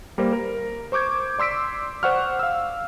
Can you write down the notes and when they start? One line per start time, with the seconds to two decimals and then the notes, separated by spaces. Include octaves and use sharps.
0.18 G3 A#3 A#4 C5
0.32 A#4
0.92 C5 C#6 D6 G6 G#6
1.39 D5 C6 E6 B6 D7
2.03 C5 D5 F#5 C#6 F6
2.39 F5 E6